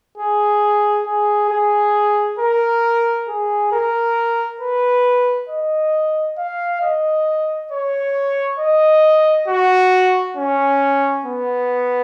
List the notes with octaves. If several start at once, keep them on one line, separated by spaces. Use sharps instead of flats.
G#4
G#4
G#4
A#4
G#4
A#4
B4
D#5
F5
D#5
C#5
D#5
F#4
C#4
B3